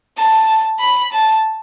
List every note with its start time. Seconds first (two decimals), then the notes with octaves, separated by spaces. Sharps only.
0.17 A5
0.80 B5
1.12 A5